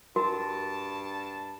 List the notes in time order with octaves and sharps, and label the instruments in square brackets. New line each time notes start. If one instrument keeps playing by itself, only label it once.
[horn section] G2 A5 [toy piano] F#4 A#4